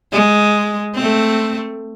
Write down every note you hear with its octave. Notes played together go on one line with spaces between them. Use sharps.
G#3
A3 C4